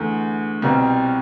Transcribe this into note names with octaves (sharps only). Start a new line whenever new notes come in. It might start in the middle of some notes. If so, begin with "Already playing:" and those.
Already playing: E2 D3 A3
C2 B2 G3 C4